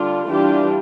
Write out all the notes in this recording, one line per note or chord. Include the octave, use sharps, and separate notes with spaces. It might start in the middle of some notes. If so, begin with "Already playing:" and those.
Already playing: D3 G3 D4 F4
E3 G3 D4 F4 G4